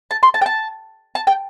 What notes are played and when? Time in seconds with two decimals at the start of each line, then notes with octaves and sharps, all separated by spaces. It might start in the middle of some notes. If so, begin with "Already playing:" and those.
0.11 A5
0.23 C6
0.34 A5
0.42 G5
0.46 A5
1.15 A5
1.27 G5